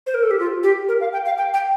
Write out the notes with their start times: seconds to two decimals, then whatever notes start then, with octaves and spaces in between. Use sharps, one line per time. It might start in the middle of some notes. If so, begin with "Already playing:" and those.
0.07 C5
0.14 A#4
0.23 A4
0.31 G4
0.39 F4
0.63 G4
0.88 A#4
1.01 F5
1.13 G5
1.25 F5
1.38 G5
1.54 G5